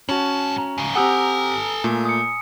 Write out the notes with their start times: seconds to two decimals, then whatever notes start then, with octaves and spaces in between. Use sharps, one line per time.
0.09 G#2 C#4 F#4 A5 F#7
0.58 A#5
0.78 G#2 C#3
0.95 C4 G4 A4 F#5 G#5 A#5 D#6 E6
1.84 A#2 A3
2.05 D#6 C#7